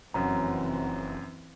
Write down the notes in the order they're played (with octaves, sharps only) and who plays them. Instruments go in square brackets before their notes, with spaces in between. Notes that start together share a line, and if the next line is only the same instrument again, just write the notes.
[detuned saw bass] F1 [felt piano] F#2 F#3 C#4 [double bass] E3 C4 [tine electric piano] A#5